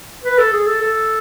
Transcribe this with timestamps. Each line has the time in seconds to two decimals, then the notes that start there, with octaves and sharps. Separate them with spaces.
0.24 B4
0.39 A4
0.53 G#4
0.67 A4
0.82 A4